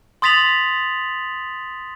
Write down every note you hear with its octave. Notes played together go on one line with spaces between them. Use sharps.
C6 D#6 A6 B6 F7 F#7